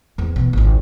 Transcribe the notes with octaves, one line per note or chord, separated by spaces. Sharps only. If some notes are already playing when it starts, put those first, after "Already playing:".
E2 C4
B2 E3
G#1 C#2